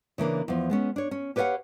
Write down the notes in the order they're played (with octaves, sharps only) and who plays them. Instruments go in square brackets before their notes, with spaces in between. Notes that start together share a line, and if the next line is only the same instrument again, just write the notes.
[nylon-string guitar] C#3 E3 A#3 D4
E2 F3
G#3 B3 C#4
D4 C#5
C#4
G4 B4 C#5 D5 F5 F#5